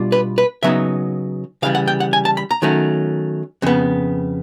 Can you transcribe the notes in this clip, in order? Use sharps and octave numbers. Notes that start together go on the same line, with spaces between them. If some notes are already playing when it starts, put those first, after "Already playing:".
Already playing: B2 G3 D4 F4
B4
B4
C#3 F#3 B3 D#4 E5
C#3 E3 G3 F5
F#5
G5
F#5
G#5
A5
B5
A#5
D#3 F#3 A3 C#4
F2 C#3 B3